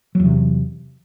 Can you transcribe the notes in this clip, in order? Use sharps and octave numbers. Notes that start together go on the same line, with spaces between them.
E2 C3 F#3